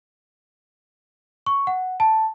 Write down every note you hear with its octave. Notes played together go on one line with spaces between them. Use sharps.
C#6
F#5
A5